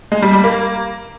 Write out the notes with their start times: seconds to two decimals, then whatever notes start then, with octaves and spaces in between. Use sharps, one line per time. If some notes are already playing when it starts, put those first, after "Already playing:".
0.12 G#3
0.22 G3
0.33 G3
0.44 A#3